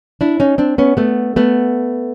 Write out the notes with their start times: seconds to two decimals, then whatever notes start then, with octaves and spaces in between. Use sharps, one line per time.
0.21 D4 E4
0.40 C#4 D#4
0.58 C4 D4
0.78 B3 C#4
0.97 A3 B3
1.36 A3 B3